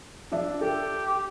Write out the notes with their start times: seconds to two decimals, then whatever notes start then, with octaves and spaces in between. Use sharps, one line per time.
0.32 F3 D4 E5
0.61 G4 A4